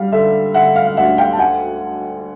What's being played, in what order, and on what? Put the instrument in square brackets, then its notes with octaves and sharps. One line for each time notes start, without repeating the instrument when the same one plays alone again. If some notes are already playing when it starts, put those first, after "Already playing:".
Already playing: [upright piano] G3 F5
D3 E5
D3 E5 F#5
F5
F5
D2 E5 F#5
F5 G5
A5
F#5 G#5